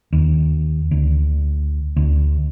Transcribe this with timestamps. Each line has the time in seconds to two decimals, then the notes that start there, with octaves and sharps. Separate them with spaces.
0.13 D#2
0.91 D2
1.96 D2